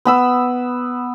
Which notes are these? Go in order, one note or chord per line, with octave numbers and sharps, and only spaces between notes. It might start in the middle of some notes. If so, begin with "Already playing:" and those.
B3 B5 E6